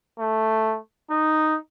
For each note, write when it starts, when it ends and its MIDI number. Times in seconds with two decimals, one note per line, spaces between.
0.19 0.78 57
1.10 1.57 63